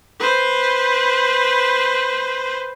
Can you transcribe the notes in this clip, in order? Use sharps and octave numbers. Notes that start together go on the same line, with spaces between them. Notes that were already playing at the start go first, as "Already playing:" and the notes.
B4 C5